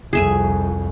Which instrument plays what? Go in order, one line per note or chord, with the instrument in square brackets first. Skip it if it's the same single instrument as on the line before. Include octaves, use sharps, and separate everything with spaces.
[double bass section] C2 F2 [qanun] G#4 E5 G#5